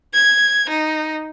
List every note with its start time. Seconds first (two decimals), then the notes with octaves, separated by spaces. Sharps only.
0.14 G#6
0.69 D#4